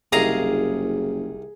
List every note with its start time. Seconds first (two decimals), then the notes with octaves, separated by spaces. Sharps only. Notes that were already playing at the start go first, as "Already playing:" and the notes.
0.12 F#1 C2 D#3 G#4 F5 A#5 D#6